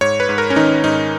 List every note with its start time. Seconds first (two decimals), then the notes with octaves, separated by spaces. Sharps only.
0.01 G#2 C#5
0.20 B4
0.29 G#2
0.38 A#4
0.50 C#4
0.56 D#3 D#4
0.84 G#2 D#4